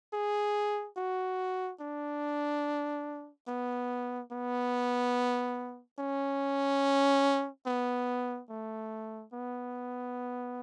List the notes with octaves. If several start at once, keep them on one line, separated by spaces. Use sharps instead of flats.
G#4
F#4
D4
B3
B3
C#4
B3
A3
B3